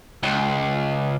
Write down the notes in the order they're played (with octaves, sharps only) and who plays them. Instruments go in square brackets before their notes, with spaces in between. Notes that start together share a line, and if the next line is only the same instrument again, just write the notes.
[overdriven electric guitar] C#2